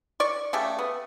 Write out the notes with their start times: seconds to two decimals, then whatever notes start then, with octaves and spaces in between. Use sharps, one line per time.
0.20 D5 C#6
0.53 C#3 A3 G4
0.79 B3